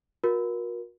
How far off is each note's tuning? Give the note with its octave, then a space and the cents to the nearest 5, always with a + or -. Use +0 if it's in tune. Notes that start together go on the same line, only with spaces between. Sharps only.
F#4 -40 A#4 +30